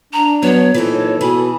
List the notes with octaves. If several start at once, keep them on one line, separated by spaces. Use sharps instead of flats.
D4 A#5
F#3 B3 C#5
A#2 E3 C4 D#4 A4
B2 E3 G#4 B5